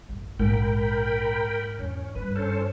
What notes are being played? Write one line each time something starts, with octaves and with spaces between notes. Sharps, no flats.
A1 F#2
A#1 G#2 D#4 A#4 G5 B5
E2 C#4
G2 B4
C#4 A4 C5